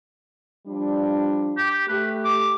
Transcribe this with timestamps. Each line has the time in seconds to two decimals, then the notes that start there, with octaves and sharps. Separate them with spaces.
0.67 F3 G3 D4
1.58 G4
1.88 A3 G4 B4
2.25 D6